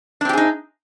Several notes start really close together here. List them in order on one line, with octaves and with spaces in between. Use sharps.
D4 C4 G4 G#4 D#4